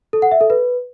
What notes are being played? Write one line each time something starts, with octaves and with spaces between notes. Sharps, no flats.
A4
F#5
E5
A4
B4